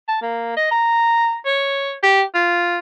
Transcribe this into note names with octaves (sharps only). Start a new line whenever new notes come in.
A5
A#3
D#5
A#5
C#5
G4
F4